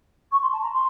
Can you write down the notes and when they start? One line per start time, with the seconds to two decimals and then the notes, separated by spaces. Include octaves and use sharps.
0.31 C#6
0.41 C6
0.52 A5
0.62 A#5
0.72 C6